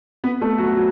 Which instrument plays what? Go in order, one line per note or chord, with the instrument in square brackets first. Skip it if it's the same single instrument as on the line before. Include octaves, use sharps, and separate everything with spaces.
[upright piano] B3 B4
A3 A4
F#3 F#4
F#3